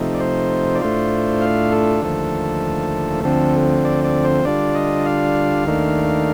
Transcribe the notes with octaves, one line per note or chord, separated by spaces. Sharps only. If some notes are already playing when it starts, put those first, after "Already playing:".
Already playing: C3 F3 A3 D#4
D5
C5
D5
A2 A3 D4 F4 C5
F5
A4
D#2 D3 F3 A3
D2 D3 F3 C4 A4
D5
D5
C5
D3 G3 D4 F4 D5
D#5
F5
D#2 D#3 A3 D4